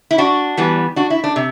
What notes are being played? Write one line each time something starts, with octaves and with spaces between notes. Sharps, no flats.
E4
D4 F#4
E3 G3 B3
D4 F#4
E4
D4
C3